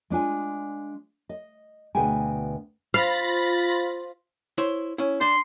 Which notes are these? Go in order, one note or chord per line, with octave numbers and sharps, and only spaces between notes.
G#3 D4 F4 G#5
D#5
D2 B2 G#4 B4 G5 G#5
F4 C5 F5 B5 A6 A#6
E4 C5 C#5
C#4 E4
D4 C6